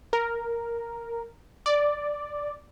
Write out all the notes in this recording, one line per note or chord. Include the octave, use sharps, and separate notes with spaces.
A#4
D5